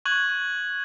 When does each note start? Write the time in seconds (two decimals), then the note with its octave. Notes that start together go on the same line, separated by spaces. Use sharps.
0.05 C#6 F#6 G#6 F#7